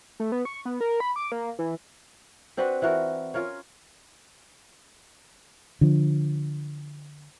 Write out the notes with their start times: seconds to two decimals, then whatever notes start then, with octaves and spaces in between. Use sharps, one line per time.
0.20 A3
0.32 B3
0.45 C#6
0.65 B3
0.81 A#4
1.00 B5
1.16 D6
1.32 A#3
1.59 E3
2.57 C4 D4 F#4 B4
2.82 E3 E4 F#4 A#4
3.34 C#4 F4 A#4 C#5
5.81 D3 F3